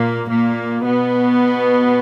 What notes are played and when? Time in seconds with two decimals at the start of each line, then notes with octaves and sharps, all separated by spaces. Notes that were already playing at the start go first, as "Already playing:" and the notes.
Already playing: A#2 A#3
0.30 A#2 A#3
0.85 B2 B3